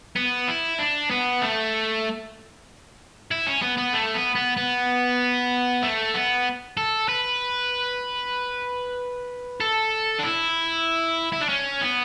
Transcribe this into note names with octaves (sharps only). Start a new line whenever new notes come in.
B3
E4
D4
B3
A3
E4
C#4
B3
B3
A3
B3
B3
B3
A3
B3
A4
B4
A4
D4
E4
E4
D4
C#4
B3